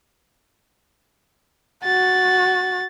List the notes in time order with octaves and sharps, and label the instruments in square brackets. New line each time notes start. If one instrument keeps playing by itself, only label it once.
[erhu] F#4 [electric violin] A6